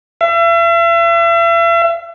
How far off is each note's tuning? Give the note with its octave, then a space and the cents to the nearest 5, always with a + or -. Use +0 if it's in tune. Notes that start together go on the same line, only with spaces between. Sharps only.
E5 +40